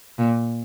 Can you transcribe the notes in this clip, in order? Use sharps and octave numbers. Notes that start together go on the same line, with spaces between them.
A#2